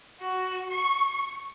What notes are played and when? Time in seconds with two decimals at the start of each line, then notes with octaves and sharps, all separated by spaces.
0.21 F#4
0.70 C#6